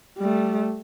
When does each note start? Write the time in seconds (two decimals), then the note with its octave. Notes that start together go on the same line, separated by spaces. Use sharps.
0.18 G3 A3